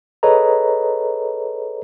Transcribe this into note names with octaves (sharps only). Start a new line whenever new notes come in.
G#4 A4 B4 C#5 D#5 A#5